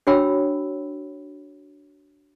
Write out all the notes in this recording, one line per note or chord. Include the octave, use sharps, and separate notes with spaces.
D4 F#4 C#5 G5 B5 E6